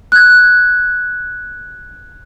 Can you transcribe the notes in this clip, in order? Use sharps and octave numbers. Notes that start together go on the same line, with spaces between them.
F#6 G#6